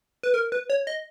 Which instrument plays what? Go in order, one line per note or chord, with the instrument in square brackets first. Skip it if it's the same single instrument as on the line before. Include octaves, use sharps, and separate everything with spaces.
[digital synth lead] B4
A#4
B4
C#5
D#5